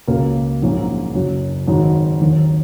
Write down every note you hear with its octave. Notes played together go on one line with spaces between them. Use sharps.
C#2 C#3 A#3 F#4 A#4
A#1 G#2 F#3 A#3 C#4
F#1 F#2 F#3 C#4 F#4
G#1 G#2 F#3 D#4 F#4
D#2 D#3 F#3